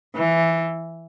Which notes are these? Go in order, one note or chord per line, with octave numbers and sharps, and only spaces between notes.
E3